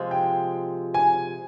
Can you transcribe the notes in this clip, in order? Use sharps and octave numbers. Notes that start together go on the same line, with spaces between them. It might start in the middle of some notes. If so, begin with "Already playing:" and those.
Already playing: C3 F3 G#3
G5
G#5